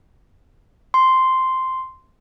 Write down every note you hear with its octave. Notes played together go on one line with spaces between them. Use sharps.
C6